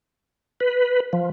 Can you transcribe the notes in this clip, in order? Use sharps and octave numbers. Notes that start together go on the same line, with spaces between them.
B4
F3